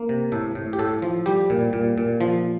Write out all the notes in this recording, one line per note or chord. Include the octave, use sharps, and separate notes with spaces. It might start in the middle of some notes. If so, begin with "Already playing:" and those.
Already playing: A#3
C3
A2 A4
A2
G4
A2 A4
F3
G3 G4
A#2
A#2
A#2
F3